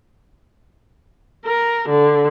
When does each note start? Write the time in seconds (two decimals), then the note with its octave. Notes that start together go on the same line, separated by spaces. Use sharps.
1.46 A#4
1.89 D3